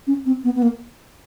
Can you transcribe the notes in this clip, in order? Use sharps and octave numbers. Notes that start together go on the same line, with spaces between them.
C#4
C4
B3
B3
A#3